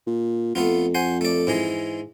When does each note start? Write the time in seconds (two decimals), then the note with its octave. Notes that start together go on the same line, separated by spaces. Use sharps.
0.06 A#2
0.55 F2 A3 B3 F4
0.95 C5 F#5 G#5
1.21 A3 D5
1.47 G#2 E3 G#3